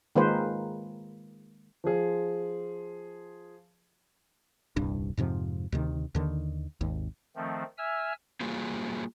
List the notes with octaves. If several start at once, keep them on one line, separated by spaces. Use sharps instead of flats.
D#3 G#3 A#3 F4 B4 C5
F3 F4 G#4
D#1 C2 G2 D4
F2 G#2 C3 F3
D2 C3 D#3
D#2 D3 D#3
G#1 D#2
D#3 F3 A3 C4
E5 G#5 E6 F6
G3 A#3 F4 F#4 G#4